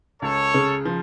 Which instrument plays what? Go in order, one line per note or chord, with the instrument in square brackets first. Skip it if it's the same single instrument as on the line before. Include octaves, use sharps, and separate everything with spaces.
[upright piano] C#2 [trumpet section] A4 C#5
[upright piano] C#3
F3